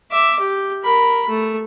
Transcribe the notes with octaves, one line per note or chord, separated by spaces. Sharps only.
E5 D6
G4
A#4 B5
A3